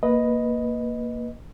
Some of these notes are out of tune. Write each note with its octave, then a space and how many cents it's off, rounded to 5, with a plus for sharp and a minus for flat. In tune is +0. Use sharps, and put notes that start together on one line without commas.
A#3 +0 B4 +0 D#5 +0